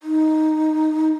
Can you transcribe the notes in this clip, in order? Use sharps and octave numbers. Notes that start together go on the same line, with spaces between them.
D#4